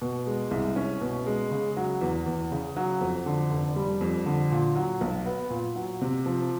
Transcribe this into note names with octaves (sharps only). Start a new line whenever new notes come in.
B2
G#3
C2
C#4
B2
G#3
C#3
F#3
E2
E2
C#3
F#3
F2
D3
F1
G3
F2
D3
A#2
F#3
B1
B3
A#2
F#3
C3
F3